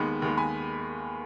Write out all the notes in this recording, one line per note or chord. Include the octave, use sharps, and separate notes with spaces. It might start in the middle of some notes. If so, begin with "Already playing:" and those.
Already playing: D#2 D#3 G#3 B3 B5
D#2 D#3 G#3 B3
G#5 B5